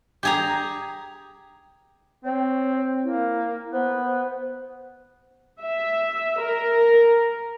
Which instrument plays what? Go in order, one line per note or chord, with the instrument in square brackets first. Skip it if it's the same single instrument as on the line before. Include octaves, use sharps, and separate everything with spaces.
[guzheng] G4 G#4 A#5
[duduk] C4 [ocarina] C#5
[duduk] A#3 [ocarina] E4
[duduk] B3 [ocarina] C5
[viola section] E5
A#4